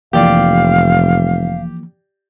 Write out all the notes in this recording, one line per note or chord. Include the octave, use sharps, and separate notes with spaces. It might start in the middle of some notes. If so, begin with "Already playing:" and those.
F1 E3 F3 A#3 G4 D5 F5